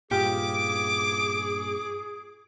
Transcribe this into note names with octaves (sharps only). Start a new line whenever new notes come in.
G2 A#2 F4 G4 G#4 D6